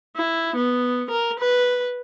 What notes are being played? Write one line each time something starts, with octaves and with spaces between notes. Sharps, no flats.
E4
B3
A#4
B4